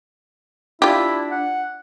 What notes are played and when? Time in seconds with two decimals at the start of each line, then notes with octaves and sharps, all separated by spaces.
0.82 D4 E4 F4 G4
1.31 F#5